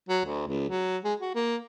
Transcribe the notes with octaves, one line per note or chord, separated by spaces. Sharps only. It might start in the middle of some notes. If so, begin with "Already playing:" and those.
F#3
D2
C#2
F#3
G#3
F#4
A#3